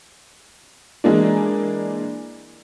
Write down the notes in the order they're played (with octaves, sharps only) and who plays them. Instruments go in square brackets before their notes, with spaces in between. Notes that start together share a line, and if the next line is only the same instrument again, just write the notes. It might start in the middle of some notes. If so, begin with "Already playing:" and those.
[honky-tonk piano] E3 G#3 A#3 D4